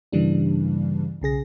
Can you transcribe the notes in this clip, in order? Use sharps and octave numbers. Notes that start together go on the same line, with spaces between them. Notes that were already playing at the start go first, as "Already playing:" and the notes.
G2 C#3 E3 G3 A#3 D4
B1 C#3 G#4 A#6